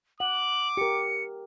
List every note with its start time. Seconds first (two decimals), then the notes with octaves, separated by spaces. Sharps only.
0.20 F#5 D6 F#7
0.77 G4 A#4 C#7